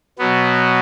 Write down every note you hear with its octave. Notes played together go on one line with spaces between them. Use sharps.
B2 F#3 B3